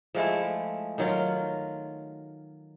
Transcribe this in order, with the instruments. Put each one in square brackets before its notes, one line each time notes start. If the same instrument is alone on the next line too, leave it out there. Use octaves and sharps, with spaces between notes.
[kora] F3 G#3 A3 E4
D#3 F#3 F4